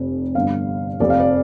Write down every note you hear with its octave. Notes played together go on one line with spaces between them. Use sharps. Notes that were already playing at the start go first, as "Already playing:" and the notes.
Already playing: F1 F2 C3
G1 G2 D3 F5
F1 F2 C3 D5
F5
D5